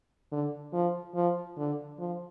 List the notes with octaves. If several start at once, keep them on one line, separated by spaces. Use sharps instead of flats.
D3
F3
F3
D3
F3